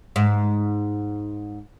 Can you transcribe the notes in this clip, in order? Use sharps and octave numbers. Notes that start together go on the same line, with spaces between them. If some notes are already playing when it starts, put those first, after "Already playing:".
G#2